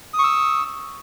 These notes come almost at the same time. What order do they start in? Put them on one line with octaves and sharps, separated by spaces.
D#6 C#6 E6